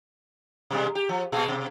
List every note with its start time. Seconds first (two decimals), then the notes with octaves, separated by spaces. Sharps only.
0.71 B2 G3 G#3
0.95 G4
1.09 F3
1.32 A#2 G#3 G#4
1.48 B2